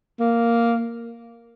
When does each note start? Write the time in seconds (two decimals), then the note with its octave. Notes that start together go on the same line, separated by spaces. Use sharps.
0.20 A#3